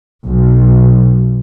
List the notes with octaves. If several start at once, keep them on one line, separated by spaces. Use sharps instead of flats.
B1